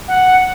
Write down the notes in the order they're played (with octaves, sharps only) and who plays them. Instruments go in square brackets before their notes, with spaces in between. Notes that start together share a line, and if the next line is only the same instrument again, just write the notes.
[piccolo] F#5